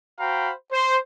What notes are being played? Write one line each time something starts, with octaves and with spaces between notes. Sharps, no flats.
F#4 C5 F5 G5 A#5 B5
C5